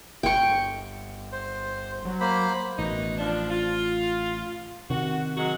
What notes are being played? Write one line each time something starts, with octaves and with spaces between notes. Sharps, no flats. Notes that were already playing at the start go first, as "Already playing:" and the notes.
G1 G5 C#6
C5
F#3
A#3 C5 B5
A1 B2 D#3 D#4
F3 D4
F4
C3 D#3 F#4
F#3 G#3 F#4